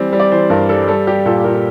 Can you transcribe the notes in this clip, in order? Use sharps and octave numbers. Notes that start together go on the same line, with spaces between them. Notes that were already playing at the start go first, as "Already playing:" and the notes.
Already playing: E3 G3 C4
G3
D5
E3 C5
G2 A#4
G3 A4
G3 A4
G3 G4
A#2 A4
A#2 A#4